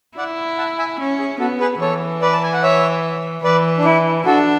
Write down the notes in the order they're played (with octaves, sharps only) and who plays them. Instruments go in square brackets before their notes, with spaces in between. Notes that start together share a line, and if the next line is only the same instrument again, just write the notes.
[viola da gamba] E4 [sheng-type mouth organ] D5 F#5
[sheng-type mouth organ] F#5 A5
E5 G#5
[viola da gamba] C#4
[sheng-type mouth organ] G#4
[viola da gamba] B3 [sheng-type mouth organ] F#4 A4
[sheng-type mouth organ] G#4 B4
[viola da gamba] E3 [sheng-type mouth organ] A4 C#5
[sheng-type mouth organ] B4 D5
A5
G#5
F#5
C#5 E5
[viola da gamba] E3 [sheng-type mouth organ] B4 D5
[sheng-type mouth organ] D4
E4
[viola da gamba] D4 [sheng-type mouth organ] F#4 A4